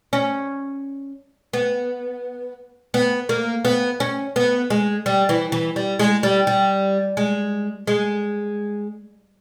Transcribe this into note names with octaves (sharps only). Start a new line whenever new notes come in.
C#4
B3
B3
A#3
B3
C#4
B3
G#3
G3
E3
E3
G3
G#3
G3
G3
G#3
G#3